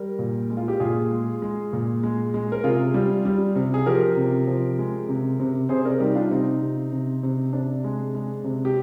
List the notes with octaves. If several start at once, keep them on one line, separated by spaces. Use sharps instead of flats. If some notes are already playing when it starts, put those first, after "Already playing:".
Already playing: G3 G4 A#4
A#2
G#3
F4
G4
A#2 F4 G#4
G#3
G#3
A#2
G#3
G#3
A#4
C3 F4 G#4
G3
G3
C3
G#4
F3 G4 A#4
C3
F3
G#3
C3
C3
C3 G#4 C5
A#4 D5
G3 D#4 G4
D4 F4
C3 C4 D#4
C3
C3
C3
C3 D4
G#3
G#3
C3
G4